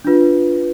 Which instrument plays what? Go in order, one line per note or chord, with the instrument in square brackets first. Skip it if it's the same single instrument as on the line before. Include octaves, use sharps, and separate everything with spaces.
[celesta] D4 F4 B4